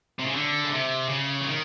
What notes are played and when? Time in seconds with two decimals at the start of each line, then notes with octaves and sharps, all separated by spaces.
0.19 C3
0.26 C#3
0.33 D3
0.64 C#3
0.71 C3
1.08 C#3
1.41 E3
1.46 D#3